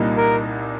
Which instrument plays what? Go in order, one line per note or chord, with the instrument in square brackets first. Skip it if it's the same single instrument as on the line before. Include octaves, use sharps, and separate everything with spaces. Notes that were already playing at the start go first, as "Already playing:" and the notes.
Already playing: [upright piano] C2 A#2 G3 A#3 D#4
[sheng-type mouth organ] A#4